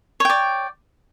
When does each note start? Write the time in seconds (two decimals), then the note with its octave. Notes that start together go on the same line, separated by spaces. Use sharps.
0.20 C#5
0.25 G5
0.30 D5